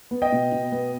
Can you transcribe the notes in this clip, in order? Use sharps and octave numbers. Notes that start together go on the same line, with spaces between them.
B3
D#5 G5
B2
B2
B3